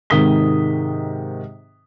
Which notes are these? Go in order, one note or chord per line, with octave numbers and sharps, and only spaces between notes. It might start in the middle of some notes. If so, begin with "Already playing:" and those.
G#2 C3 D#3 D#6 B6 G7